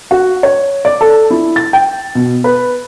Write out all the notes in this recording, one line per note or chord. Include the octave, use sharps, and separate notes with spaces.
F#4
C#5
D5
A4
E4
A6
G5
B2
B4